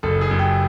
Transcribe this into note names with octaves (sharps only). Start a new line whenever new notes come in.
F#1 A4
G#4
F#2
G4